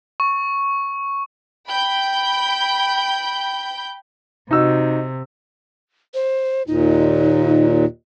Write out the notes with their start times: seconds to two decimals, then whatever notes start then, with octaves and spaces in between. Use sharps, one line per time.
0.20 C#6
1.69 G5 B5 G6
4.51 C3 D#4 F#4 E6
6.14 C5
6.67 D#2 A#2 D#4